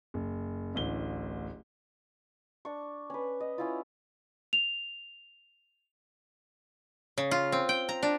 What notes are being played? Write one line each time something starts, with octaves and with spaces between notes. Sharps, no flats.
F#1
D1 A1 G7
D4 C#6
C#4 B4
D#5
C#4 E4 F4
F7
C#3
F4
C4
G5
A#5
D4